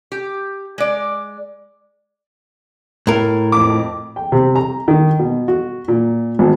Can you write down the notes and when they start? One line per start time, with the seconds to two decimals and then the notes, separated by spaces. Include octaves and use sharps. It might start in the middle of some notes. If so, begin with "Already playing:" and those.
0.12 G4
0.78 G#3 D5
3.07 A2 A#4
3.52 F2 D6
4.16 G5
4.32 C3
4.55 A#5
4.88 D#3
5.19 B2
5.48 F#4
5.88 A#2
6.39 G#1